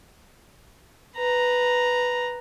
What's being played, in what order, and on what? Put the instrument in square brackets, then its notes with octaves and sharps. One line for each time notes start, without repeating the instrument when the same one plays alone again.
[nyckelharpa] B4 A#5